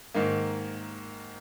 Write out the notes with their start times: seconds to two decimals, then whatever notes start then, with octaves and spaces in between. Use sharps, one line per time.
0.14 G#2 D#3 A#3